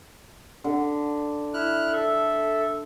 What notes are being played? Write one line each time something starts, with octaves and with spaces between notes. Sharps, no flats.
D3
E4 F6 F#6
A4 E5